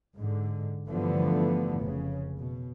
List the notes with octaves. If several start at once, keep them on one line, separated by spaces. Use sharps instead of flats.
G#2 D3
G2 D3 E3 F3 A3 B3
F1 C#3
B2